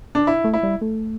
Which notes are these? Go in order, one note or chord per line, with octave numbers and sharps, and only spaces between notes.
D4
E4
A3
E4
G3
A3